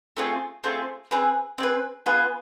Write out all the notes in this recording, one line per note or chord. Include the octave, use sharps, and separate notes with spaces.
A3 C4 F4 G#4
A3 C4 F4 G#4
C4 G#4 B4
C4 G#4 B4
B3 F4 G#4 B4